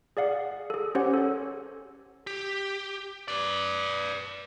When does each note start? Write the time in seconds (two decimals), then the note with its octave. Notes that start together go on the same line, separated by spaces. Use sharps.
0.17 G#4 D5 F5 F#5
0.70 G#4 A4
0.95 C#4 G4 C5 C#5 F#5
1.14 A4 C#5
2.27 G4
3.28 B4 D5